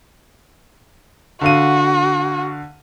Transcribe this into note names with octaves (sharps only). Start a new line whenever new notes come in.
D3 F#4 F5 D#7